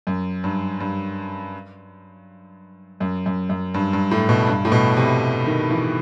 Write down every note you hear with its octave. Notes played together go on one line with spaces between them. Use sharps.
F#2
G2
G2
F#2
F#2
F#2
G2
G2
A2
B2
G2
A2
B2
C3
D#3
E3